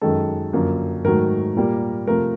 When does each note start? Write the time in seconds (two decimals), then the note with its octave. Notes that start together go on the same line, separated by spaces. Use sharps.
0.01 F#2 D#3 G#3 A4
0.53 F#2 D3 F3 A#3
1.04 G#2 D#3 F#3 A3 A#4
1.56 A#2 G3 A#3
2.07 C3 F3 A3 A#4